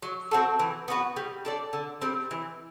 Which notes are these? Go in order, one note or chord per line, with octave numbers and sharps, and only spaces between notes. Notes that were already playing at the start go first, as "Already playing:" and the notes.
F#3
C4 F#4 A4
E3
B3 F#4 B4
G3
D4 A4 D5
D3
G3 C4
E3